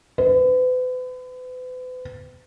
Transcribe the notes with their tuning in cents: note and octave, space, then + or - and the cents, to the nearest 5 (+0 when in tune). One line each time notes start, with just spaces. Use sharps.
B4 +40